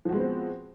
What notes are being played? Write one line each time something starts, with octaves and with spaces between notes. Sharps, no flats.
F3 G#3 B3 C4 F#4